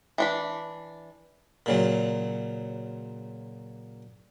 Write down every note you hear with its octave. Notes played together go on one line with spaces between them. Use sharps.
E3 D4 B5
A#2 C#3 F#3